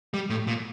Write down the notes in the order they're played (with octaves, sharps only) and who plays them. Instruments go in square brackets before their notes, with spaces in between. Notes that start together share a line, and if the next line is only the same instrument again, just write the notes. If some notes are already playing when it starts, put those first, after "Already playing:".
[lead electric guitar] G3
A2
A#2